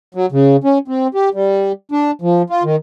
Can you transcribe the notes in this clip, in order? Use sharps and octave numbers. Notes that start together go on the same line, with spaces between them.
F#3
C#3
C#4
C4
G4
G3
D4
F3
F4
D#3